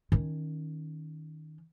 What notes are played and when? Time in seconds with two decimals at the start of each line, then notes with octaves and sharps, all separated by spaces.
0.12 D#3 C#4